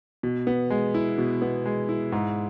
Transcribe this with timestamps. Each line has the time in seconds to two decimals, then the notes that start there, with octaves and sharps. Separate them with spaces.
0.23 B2
0.47 B3
0.70 G#3
0.94 E4
1.18 B2
1.42 B3
1.66 G#3
1.89 E4
2.12 G#2